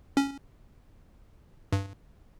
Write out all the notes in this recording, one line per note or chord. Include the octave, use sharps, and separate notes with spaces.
C#4
G2